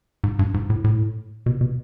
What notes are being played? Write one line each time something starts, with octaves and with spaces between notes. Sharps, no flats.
G#2
G2
G#2
A2
A2
B2
B2